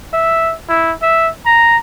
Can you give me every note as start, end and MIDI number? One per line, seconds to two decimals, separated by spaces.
0.14 0.53 76
0.69 0.92 64
1.02 1.29 76
1.46 1.77 82